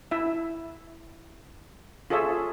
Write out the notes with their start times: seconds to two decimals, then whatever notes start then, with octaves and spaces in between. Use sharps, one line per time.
0.11 E4 E5
2.10 F4 G#4 A4 C#5 E5